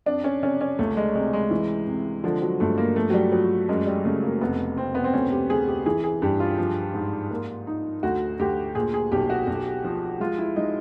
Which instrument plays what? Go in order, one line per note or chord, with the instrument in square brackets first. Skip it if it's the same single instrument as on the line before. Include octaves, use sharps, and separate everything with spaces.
[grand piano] F2 [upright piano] D4
[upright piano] C#4
[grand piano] C3 [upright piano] C#4
[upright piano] C#4
[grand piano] C#2 [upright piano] A3
[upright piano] G#3
[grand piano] C3 [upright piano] G#3
[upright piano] G#3
[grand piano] E3
C3
[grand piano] D3 [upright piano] F3
[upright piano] F#3
[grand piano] G2 [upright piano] A3
[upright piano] A#3
[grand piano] F3 [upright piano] A3
[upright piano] F#3
G3
[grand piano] F3 [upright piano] F#3
[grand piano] F#2 [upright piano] G#3
[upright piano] G3
[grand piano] C#3 [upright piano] A3
[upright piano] A#3
[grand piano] F1 [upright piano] B3
[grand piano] F1 [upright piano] C4
[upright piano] B3
C4
[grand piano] D2 [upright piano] C#4
[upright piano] G4
[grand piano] D2 [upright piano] G#4
[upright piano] G4
[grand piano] E3 [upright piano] G#4
[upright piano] G#4
[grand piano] G2 [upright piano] G4
[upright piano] F4
[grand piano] F3
G#2
A#3
D#4
[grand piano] D2 [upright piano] F#4
[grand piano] D2 [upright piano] G4
[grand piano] A#2 [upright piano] G#4
[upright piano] G#4
[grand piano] B1 [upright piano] G4
[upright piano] F#4
[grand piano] B1
F3
[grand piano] G#3 [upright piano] F4
[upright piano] E4
[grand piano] G#3 [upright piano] D#4